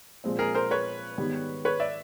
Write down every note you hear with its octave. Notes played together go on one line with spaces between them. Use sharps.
A#2 F3 G#3 C4
G#4 A#4
A#4 C5
B4 C#5
G#2 D#3 G3 B3
B4 C#5
D5 E5